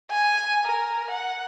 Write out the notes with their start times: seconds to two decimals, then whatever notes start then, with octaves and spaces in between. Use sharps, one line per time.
0.11 G#5
0.65 A#4
1.10 F#5